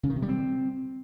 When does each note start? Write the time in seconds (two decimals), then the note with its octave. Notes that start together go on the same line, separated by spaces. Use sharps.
0.03 C#3
0.10 D#3
0.16 C3
0.22 G3
0.29 C4